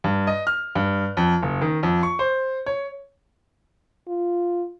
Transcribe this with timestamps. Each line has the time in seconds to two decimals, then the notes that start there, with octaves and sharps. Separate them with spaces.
0.04 G2
0.27 D#5
0.47 F6
0.75 G2
1.17 F2
1.42 F#1
1.61 D#3
1.83 F2
2.03 C#6
2.19 C5
2.66 C#5
4.08 F4